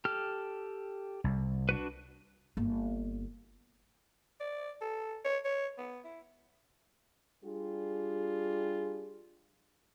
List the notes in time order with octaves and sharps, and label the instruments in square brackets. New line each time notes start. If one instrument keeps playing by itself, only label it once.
[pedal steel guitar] G4 A4 F6
[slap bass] C2
[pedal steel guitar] D4 F#4 B4
[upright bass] G1 A#3
[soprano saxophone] D5
A4
C#5
C#5
B3
E4
[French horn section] G3 D4 F4 G4 G#4